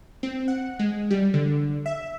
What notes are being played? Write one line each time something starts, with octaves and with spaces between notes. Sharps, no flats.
C4
F#5
G#3
G3
D3
E5